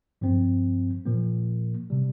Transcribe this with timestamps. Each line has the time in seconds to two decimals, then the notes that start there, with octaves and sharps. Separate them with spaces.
0.21 G2 F3 C4
1.06 A#2 F3 A#3
1.90 C3 G3